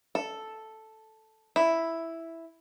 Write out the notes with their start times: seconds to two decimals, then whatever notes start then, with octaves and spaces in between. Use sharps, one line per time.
0.15 A4
1.56 E4